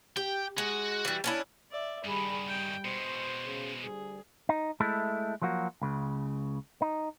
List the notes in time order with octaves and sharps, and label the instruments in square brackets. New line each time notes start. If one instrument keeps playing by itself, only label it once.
[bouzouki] G4 [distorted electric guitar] G5
[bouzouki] G#3 [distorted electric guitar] F#4
[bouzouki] E3 G3
C#4 D4 E4
[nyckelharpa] D5 E5
[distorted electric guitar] G2 D#3 [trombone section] G3 [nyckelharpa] G#4 B5
[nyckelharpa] G5
[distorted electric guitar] B2 G#3 [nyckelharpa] C5
[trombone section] C#3
[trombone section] D2 G3 [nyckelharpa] G#4
[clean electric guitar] D#4
G#3 A3 E4 A4
F3 F#3 A#3 F#4
C#2 C#3
D#4